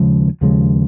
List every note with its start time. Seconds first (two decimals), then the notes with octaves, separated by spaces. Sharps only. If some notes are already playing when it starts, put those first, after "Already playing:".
Already playing: D#2 C#3 F3 G#3
0.41 D#2 C#3 F3 G#3